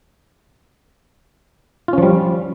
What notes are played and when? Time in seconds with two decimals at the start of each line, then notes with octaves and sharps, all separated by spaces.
1.88 F4
1.93 C#4
1.98 F3
2.03 G3